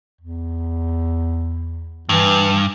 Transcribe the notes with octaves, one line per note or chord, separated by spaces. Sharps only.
E2
G2 E3